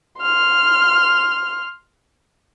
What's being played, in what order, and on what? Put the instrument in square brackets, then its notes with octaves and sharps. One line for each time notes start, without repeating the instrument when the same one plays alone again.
[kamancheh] C6 F6